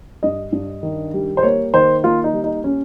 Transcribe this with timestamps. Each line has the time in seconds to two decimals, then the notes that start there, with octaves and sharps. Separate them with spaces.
0.23 G2 D#5
0.53 G2
0.83 D#3
1.14 G3
1.37 C5
1.43 A#3 C#5
1.74 D#3 C5
2.04 A#3 F4
2.24 D#4
2.33 G3
2.44 D#4
2.64 C#4